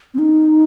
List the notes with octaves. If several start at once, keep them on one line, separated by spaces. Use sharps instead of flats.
C4
D#4